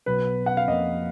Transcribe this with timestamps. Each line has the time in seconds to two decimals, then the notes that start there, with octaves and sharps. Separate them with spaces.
0.06 B1 B2 F#3 B3 B4
0.46 F#5
0.57 F5
0.68 F2 F3 A#3 D#5